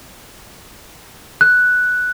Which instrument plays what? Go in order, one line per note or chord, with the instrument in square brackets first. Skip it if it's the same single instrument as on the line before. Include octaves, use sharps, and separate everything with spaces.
[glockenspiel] F#6